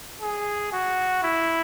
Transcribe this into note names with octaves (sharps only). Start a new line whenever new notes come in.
G#4
F#4
E4